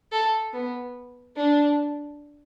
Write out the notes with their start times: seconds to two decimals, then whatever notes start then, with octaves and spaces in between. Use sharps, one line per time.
0.12 A4
0.53 B3
1.36 D4